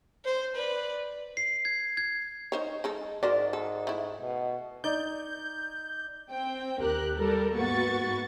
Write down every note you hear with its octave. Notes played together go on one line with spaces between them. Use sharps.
C5
B4 D5
C7
G#6
G#6
D#4 C5 C#5
G#3 D#4 A4
G#2 F#4 A#4 C5 D5
A4
A3 E4
B2
D#4 D5 G6
C4 G5
D#2 G4 A#4 F#6
G3 A4 A#4
G#2 A#3 B3 F#4 C#6 A6